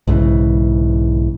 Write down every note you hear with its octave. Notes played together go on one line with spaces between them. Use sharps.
B1 G#2 C#3 E3